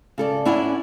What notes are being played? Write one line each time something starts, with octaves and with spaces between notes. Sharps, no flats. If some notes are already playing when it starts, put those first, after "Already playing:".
C#3 A4 D5
C#4 D4 E4 D5 F#5 G#5